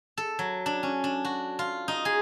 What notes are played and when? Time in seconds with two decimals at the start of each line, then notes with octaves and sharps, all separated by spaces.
0.17 A4
0.39 F#3
0.66 D4
0.83 C#4
1.04 D4
1.25 F#4
1.59 F4
1.88 D#4
2.05 G#4